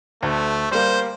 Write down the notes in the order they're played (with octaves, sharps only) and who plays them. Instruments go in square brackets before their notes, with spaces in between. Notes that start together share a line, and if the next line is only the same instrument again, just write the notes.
[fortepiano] D2 [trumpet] A3
[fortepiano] G3 A#3 [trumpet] C5